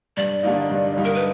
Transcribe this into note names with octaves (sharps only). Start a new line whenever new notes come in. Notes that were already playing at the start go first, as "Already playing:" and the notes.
G2 D5
D3 G3 A#3 D#4
G2
D3 G3 A#3 D#4
A#4
B4